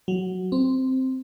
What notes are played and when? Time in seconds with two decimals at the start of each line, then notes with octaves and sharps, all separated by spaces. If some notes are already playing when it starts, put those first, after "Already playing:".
0.08 F#3
0.52 C4